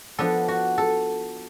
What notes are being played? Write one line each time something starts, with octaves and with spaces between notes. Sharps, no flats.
F3 B3 D4 A4
F#4
A4